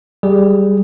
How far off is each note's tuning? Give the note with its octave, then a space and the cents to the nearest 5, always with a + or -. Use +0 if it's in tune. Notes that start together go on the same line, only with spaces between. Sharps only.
G3 +0 G#4 +5